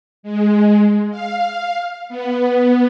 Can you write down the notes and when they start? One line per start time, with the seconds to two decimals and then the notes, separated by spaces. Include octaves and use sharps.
0.23 G#3
1.11 F5
2.09 B3